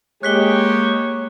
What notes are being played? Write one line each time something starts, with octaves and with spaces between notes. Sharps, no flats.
G#3 A#3 G4 C#5 F#6 B6 G7